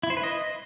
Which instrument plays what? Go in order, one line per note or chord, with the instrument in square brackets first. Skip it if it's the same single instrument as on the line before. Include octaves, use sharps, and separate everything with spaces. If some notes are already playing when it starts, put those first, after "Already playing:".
[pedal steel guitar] E4
C5
B4
D#5